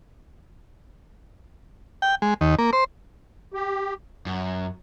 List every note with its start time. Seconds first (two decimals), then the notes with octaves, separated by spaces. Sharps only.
2.02 G5
2.22 G#3
2.41 D#2
2.58 A#3
2.73 C5
3.54 G4
4.26 F#2